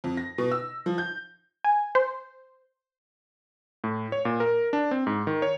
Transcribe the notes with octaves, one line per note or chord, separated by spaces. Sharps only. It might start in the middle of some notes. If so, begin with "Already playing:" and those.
F2
A#6
B2
E6
F3
G6
G#5
C5
A2
C#5
A#2
A#4
D4
C4
G#2
D#3
C#5